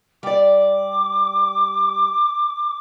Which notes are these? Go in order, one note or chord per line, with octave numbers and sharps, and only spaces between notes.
G3 D5 D6